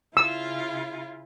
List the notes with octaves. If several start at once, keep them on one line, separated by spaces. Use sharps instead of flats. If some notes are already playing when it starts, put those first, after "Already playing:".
C#3 E4 F4 E6